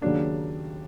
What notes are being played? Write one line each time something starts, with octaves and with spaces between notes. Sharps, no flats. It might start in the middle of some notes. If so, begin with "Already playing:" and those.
D#2 C#3 F#3 A#3 D4